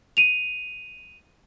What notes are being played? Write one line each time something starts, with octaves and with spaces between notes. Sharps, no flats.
D#7 F7